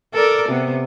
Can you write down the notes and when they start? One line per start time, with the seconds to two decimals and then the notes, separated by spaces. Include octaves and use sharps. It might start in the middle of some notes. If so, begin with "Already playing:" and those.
0.14 A4 A#4 D5
0.49 C3 B3